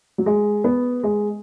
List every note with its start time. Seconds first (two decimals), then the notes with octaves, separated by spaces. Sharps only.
0.18 F#3
0.26 G#3
0.64 B3
1.03 G#3